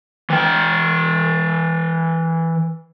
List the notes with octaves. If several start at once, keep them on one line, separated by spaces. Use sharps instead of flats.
E3 G5